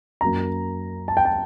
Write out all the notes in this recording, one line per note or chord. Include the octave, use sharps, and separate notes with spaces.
F#2 F#3 A#3 A#5
A5
G5
A5